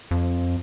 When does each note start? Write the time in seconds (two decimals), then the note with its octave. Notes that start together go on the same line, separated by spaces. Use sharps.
0.11 F2